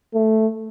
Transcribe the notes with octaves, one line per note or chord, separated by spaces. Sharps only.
A3